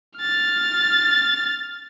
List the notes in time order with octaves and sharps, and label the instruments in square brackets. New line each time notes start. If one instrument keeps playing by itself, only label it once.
[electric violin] F6 A6